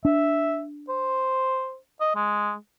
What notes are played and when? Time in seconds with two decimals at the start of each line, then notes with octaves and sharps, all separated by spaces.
0.05 D4 E5
0.89 C5
2.01 D#5
2.15 G#3